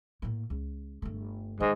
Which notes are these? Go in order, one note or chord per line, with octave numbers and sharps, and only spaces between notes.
A2 A#3
C#2
G1 A3
G#2 D#3 B3